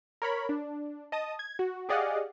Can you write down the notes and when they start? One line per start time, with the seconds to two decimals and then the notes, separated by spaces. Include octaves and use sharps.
0.22 A#4 C#5 B5
0.49 D4
1.12 D#5 A5 D#6
1.39 G#6
1.59 F#4
1.89 G4 G#4 D5 D#5 F5 F#5